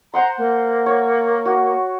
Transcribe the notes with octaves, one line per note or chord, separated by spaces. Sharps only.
C5 F#5 A#5 C6
A#3
C#5
F#4